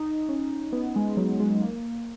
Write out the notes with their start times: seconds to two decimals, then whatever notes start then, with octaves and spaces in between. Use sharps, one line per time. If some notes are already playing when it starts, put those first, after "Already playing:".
Already playing: D#4
0.29 C#4
0.73 B3
0.96 G#3
1.17 F#3
1.40 G#3
1.62 A#3